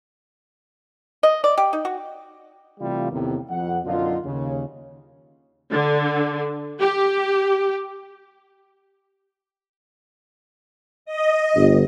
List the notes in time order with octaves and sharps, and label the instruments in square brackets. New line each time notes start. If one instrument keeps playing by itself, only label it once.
[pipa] D#5
D5
G4
D#4
F#4
[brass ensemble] C3 E3 G3 A3 F4
E2 A2 C3 D#3
F2 F#5
B1 F#2 D3 D#4 F4
D#2 C#3
[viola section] D3
G4
[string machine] D#5
[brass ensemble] G1